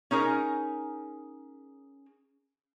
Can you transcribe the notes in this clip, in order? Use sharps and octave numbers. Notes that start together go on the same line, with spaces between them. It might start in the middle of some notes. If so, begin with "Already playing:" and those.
C#4 D#4 G#4 A#4